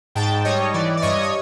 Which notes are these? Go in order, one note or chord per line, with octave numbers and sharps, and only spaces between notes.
G#2 G5 A5
G3 C#5 D#5
E3 D5
D5
G2 C#5 D#5
C#5